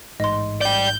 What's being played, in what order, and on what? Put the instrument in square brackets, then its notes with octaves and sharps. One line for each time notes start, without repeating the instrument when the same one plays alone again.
[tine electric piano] A1 G#2 [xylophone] D#5 C6
[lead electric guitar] D5 G5 [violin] G6